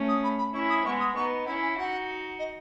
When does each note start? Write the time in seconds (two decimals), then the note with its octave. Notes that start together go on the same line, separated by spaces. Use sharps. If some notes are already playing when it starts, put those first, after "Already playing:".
Already playing: A3 C#4
0.08 D#6
0.24 B5
0.38 B5
0.54 C#4 E4 C#6
0.70 D#6
0.85 G#3 B3 C#6
1.00 D#6
1.16 B3 D#4 C#6
1.46 C#4 E4 B5
1.62 G#5
1.77 D#4 F#4 F#5
2.39 D#5